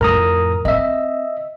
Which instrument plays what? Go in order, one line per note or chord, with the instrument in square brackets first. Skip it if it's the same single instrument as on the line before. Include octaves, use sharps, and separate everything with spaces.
[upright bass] F2 A2 [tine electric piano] A#4 A#5 D#6
[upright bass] C4 [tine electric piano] D#5 E5